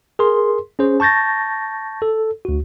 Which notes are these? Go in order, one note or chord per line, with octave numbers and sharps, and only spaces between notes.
G#4 A#4 C6
C#4 G#4 C5
A5 C#6 G6 A6 A#6
A4
D2 F#4